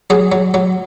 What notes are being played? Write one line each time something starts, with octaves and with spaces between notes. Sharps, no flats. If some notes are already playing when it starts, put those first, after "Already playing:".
F#3 G#4
F#3
F#3